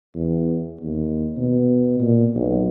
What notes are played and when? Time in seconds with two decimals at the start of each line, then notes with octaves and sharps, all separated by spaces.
0.15 E2
0.81 D#2
1.37 B2
2.00 A#2
2.35 B1